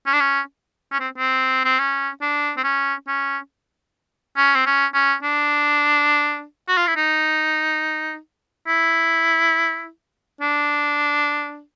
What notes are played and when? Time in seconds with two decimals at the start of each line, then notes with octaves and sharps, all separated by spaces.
0.06 C#4
0.13 D4
0.20 C#4
0.92 C#4
1.00 C4
1.17 C4
1.65 C4
1.79 C#4
2.21 D4
2.57 C4
2.64 C#4
3.07 C#4
4.37 C#4
4.55 C4
4.66 C#4
4.94 C#4
5.23 D4
6.68 F#4
6.77 F4
6.87 E4
6.96 D#4
8.67 E4
10.41 D4